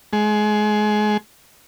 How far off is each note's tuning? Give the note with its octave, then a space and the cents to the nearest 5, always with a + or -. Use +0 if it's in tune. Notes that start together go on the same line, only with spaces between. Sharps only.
G#3 +25